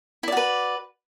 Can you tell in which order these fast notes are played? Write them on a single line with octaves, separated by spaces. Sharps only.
E4 D5 F#4 B4